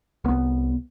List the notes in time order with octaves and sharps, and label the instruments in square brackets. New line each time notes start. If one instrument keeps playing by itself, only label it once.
[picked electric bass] C2 B3